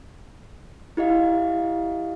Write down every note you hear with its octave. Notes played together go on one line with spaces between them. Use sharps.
E4 G4 D#5 F5